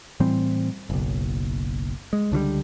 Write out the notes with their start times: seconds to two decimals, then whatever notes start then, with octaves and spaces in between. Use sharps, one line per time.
0.20 A2 E3 G3 C4
0.90 F#1 B1
2.13 G#3
2.32 C#2 D3 E3 G3